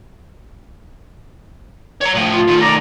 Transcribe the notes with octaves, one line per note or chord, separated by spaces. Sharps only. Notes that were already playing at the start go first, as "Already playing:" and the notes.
C#5 A#5
A2 F3
F4
D#3 A3
D5 A#5